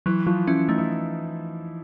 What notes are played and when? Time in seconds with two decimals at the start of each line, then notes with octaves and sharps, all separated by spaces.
0.06 E3 F#3 E4
0.26 F3 F#3 F4
0.47 E3 C#4 E4
0.69 A3 D#4
0.78 E4